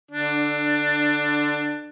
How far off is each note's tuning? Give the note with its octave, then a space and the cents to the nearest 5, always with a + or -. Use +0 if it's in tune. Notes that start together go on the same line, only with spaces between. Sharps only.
D3 +0 D4 +15